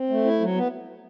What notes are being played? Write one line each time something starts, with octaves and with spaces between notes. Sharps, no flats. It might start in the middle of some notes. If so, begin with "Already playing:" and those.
Already playing: C4
A3
E4
F#3
B3